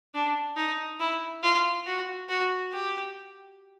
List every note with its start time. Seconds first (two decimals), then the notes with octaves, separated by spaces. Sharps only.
0.14 D4
0.56 D#4
1.00 E4
1.43 F4
1.87 F#4
2.29 F#4
2.72 G4